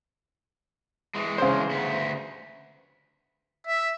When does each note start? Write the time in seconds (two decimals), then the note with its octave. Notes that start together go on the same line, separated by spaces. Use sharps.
1.15 E3 G#3
1.38 C#3 C5
1.71 D2 B3
3.67 E5